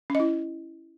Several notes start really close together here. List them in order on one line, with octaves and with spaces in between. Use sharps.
C#4 D#5 E4